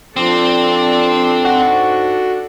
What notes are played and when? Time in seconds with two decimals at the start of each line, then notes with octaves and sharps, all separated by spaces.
0.16 F3 C4 D4 A4 C5 D5
1.45 G#2 F#4